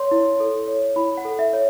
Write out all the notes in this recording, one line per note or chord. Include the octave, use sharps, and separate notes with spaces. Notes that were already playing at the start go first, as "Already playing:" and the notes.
Already playing: C#5 C6
E4
A4
C#5
E4 B5
F#5
A4
E5
C#5